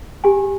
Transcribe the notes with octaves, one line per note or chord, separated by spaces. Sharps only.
G4 G#5